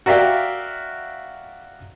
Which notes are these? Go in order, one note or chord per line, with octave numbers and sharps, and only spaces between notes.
F#4 A#4 D5 E5 F5 G5